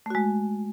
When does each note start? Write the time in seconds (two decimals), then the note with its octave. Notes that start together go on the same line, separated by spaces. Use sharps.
0.06 A3
0.10 F#4
0.15 G#3